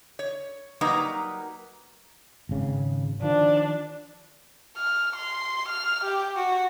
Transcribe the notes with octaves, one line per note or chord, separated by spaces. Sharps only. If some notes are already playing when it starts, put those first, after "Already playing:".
C#5
F#3 G3 A#3 D#4 B4 A#5
G#1 C#3
D#3 F3 D4
F6
C6
F6
G4
F#4